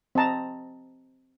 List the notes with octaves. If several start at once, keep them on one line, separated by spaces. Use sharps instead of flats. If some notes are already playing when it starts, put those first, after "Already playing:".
C4 D#5 A5 A#5